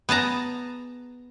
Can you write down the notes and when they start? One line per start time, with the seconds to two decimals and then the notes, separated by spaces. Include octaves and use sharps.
0.09 B3 G#4 A5 A#5